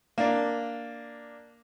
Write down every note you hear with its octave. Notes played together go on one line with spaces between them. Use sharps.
A#3 D4